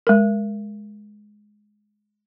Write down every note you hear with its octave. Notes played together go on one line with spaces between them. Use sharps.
G#3 A#4